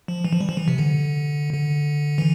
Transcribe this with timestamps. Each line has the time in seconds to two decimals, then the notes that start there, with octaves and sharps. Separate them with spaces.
0.08 F3
0.25 E3
0.33 F3
0.40 G3
0.49 F3
0.57 E3
0.68 C3
0.78 D3
1.54 D3
2.18 E3